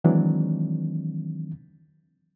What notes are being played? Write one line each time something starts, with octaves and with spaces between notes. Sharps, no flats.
D#3 E3 F#3 G#3 C4 D4